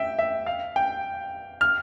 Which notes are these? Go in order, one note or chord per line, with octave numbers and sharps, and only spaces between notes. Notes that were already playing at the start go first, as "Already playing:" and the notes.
Already playing: E5 G5
E5
F5
G5
F6